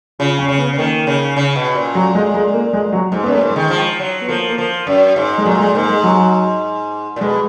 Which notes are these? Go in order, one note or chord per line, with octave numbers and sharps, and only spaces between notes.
C#3 F4
C#4
C#3
B3
C#3
D#3 A#3
C#3
C#3
B2
A#2
F#3
G#3
G#3
A#3
G#3
F#3
G#2 G#3
F#2 B3
A#3
G#2
G#3
D#3
F3
F#3
B3
F3 A#3
A#3
F3
F#2
G#2
G#3
A#2 F#3
G#3
G#2 A#3
G#3
F#3
A#2
B2 G#3